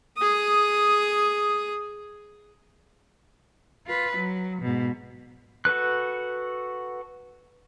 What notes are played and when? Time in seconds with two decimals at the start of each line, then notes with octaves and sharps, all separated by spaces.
0.17 G#4 D#6
3.87 F4 B4
4.17 F#3
4.62 G#2 B2
5.65 F#4 A4 B4 F#6